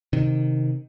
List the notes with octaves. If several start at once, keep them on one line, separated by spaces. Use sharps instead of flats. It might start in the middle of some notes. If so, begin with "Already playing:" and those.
C3 D#3